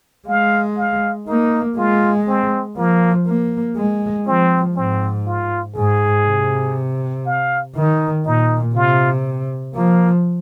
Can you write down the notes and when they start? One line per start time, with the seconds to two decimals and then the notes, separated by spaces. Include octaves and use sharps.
0.28 G#3 F5
0.77 F5
1.27 A#3 D#4
1.78 G#3 F4
2.27 C4
2.77 F3 A#3
3.27 A#3
3.77 G#3
4.26 F3 C4
4.76 G#2 C4
5.26 F4
5.76 G#2 G#4
6.26 C3
7.26 F5
7.75 D#3 D#4
8.25 A#2 D#4
8.75 C3 F4
9.75 F3 A#3